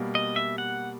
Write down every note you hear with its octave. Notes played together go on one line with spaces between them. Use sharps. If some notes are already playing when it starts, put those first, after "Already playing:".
Already playing: B2 G3 A#3
D#5
E5
F#5